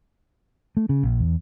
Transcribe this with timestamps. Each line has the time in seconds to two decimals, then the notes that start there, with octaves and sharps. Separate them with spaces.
0.77 A3
0.89 C#3
1.03 A#1
1.20 E2